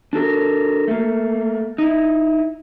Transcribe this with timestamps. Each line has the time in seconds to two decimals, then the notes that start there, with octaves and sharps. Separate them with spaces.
0.13 D4 F#4 A4 A#4
0.88 A3 A#3
1.78 D#4 E4